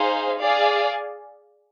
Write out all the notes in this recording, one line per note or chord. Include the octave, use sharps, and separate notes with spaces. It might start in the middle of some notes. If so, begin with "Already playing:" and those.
Already playing: D#4 G#4 C5 F5
G#4 D5 F5